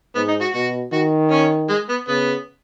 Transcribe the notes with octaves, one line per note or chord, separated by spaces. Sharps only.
G#2 B3
D#4
F#4
B2 F#4
D#3 F#4
C#4
G#3
B3
C#3 B3